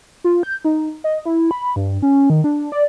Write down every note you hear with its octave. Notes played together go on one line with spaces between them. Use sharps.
F4
G6
D#4
D#5
E4
B5
G2
C#4
D#3
D4
D5